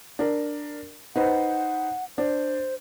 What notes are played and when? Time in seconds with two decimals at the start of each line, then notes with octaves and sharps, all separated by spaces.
0.19 D4 A#4
1.16 D#4 B4 C5 F#5
2.18 D4 C5